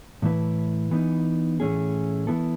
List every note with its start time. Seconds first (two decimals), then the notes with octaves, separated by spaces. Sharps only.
0.22 A2 E3 A3 E4 B4
0.91 E3 B3 D#4
1.60 A2 E3 A3 C#4 G#4
2.27 E3 B3 E4 A4